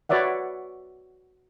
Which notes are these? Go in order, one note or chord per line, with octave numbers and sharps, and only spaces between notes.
F#4 B4 C#5 D5 E5 F#5